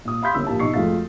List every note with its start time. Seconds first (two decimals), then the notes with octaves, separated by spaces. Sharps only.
0.05 A#2 D#6
0.22 F5 B5 C6 G6 B6
0.34 G1 A#3 C#4 E4 E6
0.47 A#1 A#3 E4 G4 A5
0.59 B2 D#4 E4 D#5 C#6 C7
0.74 F2 G#3 A3 F#4 F5 A6